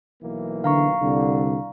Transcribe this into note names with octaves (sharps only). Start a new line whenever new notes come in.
B1 E3 A#3
D3 F5 A#5 C#6
C2 D3